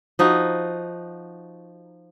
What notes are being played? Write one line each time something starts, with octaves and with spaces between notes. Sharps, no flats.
F3 D#4 F#4